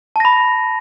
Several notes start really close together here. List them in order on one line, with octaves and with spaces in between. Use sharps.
A5 A#6 B5